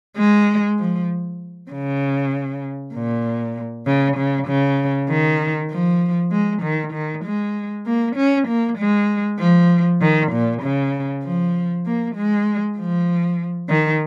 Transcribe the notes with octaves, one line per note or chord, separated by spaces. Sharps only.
G#3
F3
C#3
A#2
C#3
C#3
C#3
D#3
F3
G#3
D#3
D#3
G#3
A#3
C#4
A#3
G#3
F3
D#3
A#2
C#3
F3
A#3
G#3
F3
D#3